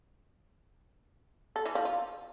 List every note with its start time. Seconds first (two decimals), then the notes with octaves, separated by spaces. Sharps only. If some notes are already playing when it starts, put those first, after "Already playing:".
1.56 A4
1.66 E3
1.75 F3
1.85 F4